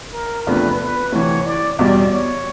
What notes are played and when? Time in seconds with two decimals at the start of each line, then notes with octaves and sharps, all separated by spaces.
0.13 A#4
0.46 E2 C3 F3 A3 D4 B4
0.80 B4
1.12 D2 C3 E3 C#5
1.46 D5
1.79 E2 B2 G3 D5
2.11 C#5